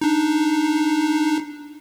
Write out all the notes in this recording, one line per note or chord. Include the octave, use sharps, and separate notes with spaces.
D4 D#4